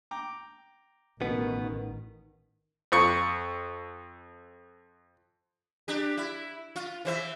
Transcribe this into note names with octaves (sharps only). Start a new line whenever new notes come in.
G5 A#5 D6
A1 B2 D#3 B3
F2 C#6
D4 G4
E4
F4
E3 C5 E5